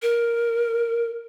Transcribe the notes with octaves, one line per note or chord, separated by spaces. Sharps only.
A#4